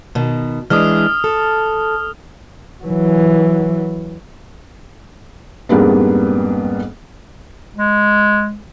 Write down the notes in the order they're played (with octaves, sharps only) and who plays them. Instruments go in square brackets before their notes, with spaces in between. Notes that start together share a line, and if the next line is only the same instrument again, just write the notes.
[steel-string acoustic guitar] B2 D#3
[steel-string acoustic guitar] E3 G#3 D4 [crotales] D#6 F6
[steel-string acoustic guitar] A4
[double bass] E3 F#3
[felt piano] F2 G#2 G3 A#3 B3 D4
[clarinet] G#3